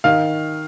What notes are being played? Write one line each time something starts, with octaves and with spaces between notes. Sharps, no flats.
D#3 F5